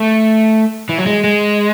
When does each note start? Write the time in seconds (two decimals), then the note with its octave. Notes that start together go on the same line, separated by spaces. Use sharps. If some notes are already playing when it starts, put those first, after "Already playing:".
Already playing: A3
0.89 E3
0.98 F#3
1.06 G#3
1.24 G#3